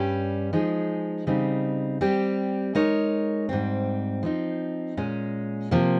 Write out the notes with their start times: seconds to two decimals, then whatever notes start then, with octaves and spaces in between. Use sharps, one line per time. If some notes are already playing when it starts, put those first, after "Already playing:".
Already playing: G2 G3 C#4 G4
0.53 F3 G#3 D#4 G#4
1.27 C#3 G3 C4 D#4
2.01 G3 C4 G4
2.75 G#3 D#4 A#4 C#5
3.49 G#2 G3 C4
4.23 F3 C4 D#4
4.97 A#2 G#3 C#4
5.71 C3 F3 A#3